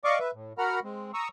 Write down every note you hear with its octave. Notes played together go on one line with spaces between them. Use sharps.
D5 D#5 F5 C#6 D6
B4 E5
A2
F#4 A#4 F#5 A#5 B5 F6
G#3 C4
A#5 C#6 D#6 E6